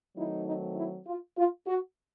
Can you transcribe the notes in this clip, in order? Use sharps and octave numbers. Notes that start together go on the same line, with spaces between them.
D#3 F#3 A3 C4 D#4 E4
D#4
E4
F4
F4
F#4